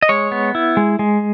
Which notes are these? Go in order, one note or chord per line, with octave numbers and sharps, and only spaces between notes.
D#5
G#3 C#5
B3
E4
G#3
G#3